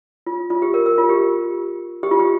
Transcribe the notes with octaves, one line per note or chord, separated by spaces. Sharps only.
F4
F4
G4
A#4
A#4
F4
G4
G4
F4
G4